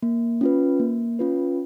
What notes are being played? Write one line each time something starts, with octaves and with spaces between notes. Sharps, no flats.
A#3
C#4 F4 B4
A#3
C#4 F4 B4